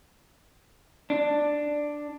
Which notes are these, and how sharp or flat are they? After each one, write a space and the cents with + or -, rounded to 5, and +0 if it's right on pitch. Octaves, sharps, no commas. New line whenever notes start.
D4 +5